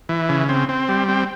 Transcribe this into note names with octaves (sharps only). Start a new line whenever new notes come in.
E3
C#3
C4
C4
G3
C4